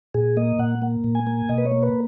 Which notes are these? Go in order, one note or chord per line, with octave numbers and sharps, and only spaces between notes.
A#2 G#4
A#3 D#5
A#2 F#5
A#3
A#2
G#5
A#3
B2 D#5
B4
C#5
A#3
B4